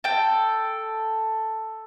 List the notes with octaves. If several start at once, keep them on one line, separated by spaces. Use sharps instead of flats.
A4 G5